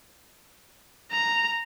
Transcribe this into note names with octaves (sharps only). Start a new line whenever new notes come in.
A#5